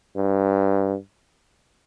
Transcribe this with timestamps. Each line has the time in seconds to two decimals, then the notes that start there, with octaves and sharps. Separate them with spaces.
0.17 G2